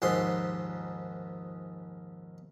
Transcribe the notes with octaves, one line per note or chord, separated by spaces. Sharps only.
A#1 D#2 G#2 C6 D#6